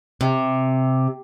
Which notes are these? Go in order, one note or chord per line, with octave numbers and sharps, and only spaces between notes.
C3